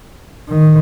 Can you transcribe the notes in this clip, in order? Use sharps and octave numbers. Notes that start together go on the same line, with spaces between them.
D#3